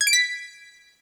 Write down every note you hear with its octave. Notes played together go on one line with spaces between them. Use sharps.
G#6
D7
B6